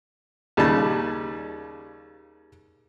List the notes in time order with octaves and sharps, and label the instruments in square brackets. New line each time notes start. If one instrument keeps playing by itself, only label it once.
[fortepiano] D#2 C#3 G3 A5